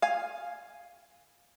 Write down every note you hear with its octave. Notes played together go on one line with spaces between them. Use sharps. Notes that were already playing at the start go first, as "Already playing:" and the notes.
F5 G#5